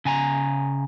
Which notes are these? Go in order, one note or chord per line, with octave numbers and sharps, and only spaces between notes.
C#3 G#5 A#5